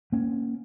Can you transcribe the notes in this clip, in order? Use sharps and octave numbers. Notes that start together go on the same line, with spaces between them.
A#3 C#4